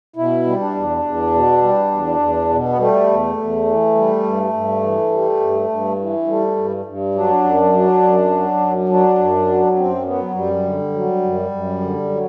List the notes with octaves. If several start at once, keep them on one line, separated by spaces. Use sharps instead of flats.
B2 E4
G3
D4
E2
E2
B2
G3
E2
E2
B2
B3
G3 A3
E2
E2
E3
G3
G2
G2
E3
G3
G2
G2
E3
G3 A3
G2
G2
F#3 D4
F#2
F#3
F#2
F#3
F#2
F#3 D4
F#2
F#3
F#2 C4
F#3 B3
F#2 G3
D3
F#3
F#2
F#2
D3
F#3